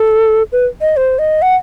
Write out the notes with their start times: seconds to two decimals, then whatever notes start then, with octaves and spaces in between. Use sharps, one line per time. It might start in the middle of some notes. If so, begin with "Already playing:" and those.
Already playing: A4
0.52 B4
0.81 D#5
0.97 C5
1.19 D#5
1.42 F#5